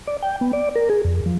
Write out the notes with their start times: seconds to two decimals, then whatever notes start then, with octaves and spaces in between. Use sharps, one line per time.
0.07 D5
0.23 G5
0.41 B3
0.53 D5
0.75 A#4
0.90 G#4
1.05 F2
1.26 F3